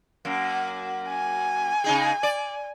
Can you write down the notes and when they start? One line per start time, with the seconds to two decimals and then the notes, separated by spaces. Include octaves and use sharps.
0.25 F#2 A#3
1.08 G#5
1.84 C#3 D#4 G#4
2.23 D5